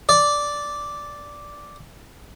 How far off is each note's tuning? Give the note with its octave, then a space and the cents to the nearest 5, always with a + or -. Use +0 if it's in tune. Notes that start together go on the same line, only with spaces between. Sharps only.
D5 -5